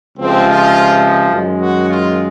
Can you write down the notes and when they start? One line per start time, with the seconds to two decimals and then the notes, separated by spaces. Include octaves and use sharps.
0.17 C#2 C3 F3 G#3 C4
0.47 F4
1.32 F#2 D#3 G#3
1.60 F#4
1.89 F4